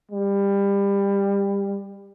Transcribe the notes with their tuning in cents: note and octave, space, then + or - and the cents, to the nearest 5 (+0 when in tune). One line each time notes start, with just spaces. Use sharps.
G3 +25